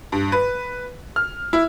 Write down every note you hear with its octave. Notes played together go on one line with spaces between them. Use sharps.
G2
B4
F6
E4